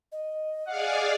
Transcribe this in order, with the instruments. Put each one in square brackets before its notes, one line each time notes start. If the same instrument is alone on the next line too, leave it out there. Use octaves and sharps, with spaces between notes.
[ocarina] D#5
[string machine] G#4 D5 F5 [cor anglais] F#5